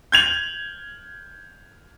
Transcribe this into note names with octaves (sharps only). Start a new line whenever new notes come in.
G6 G#6 F7 F#7